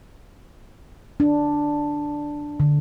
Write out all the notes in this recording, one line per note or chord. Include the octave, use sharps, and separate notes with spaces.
D4
D3